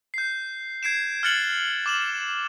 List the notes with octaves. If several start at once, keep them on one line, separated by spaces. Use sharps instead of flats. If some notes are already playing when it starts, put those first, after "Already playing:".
G6 C7
G#6 C7 D7 E7
F6 F#6 A6 C#7 F#7 G7
D6 E7 F#7